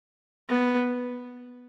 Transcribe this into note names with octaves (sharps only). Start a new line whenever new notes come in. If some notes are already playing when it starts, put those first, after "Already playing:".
B3